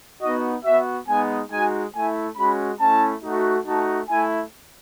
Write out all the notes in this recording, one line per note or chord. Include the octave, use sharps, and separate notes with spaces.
B3 D#4 F#4 D#5
B3 F#4 E5
G#3 B3 D#4 G#5
G#3 D#4 F#4 G#5
A3 E4 G#5
G#3 C#4 F#4 B5
A3 C#4 E4 A5
A3 D#4 F#4
A3 D#4 F#4 A5
A3 E4 G#5